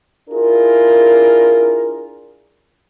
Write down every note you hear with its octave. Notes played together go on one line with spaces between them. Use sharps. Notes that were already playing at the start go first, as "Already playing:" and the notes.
D4 E4 F4 G#4 A#4